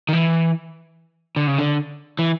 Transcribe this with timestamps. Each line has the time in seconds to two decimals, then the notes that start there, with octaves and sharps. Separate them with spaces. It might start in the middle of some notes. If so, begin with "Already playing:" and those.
0.09 D#3
0.13 E3
1.36 D3
1.47 C#3
1.59 D3
2.19 E3